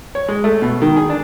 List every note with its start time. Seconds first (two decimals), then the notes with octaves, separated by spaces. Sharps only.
0.15 C#5
0.28 G#3
0.44 A3
0.62 B2
0.82 D#3
0.96 G#4
1.10 D4